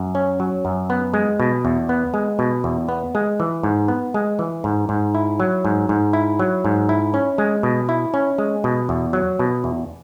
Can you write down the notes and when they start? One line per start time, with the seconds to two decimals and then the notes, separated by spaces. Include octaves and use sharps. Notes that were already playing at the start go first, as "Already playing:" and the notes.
Already playing: F#2
0.15 C#4
0.40 F#3
0.65 F#2
0.90 B3
1.14 G#3
1.40 B2
1.65 E2
1.89 B3
2.14 G#3
2.39 B2
2.64 E2
2.89 B3
3.15 G#3
3.40 E3
3.63 G#2
3.88 B3
4.14 G#3
4.39 E3
4.64 G#2
4.89 G#2
5.15 E4
5.40 F#3
5.65 G#2
5.89 G#2
6.13 E4
6.39 F#3
6.65 G#2
6.89 E4
7.14 C#4
7.38 G#3
7.63 B2
7.89 E4
8.14 C#4
8.38 G#3
8.64 B2
8.89 E2
9.13 F#3
9.39 B2
9.64 E2